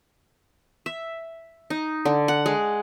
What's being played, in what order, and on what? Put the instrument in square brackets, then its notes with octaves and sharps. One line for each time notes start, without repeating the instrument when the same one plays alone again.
[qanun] E5
D#4
D3
F#5
G#3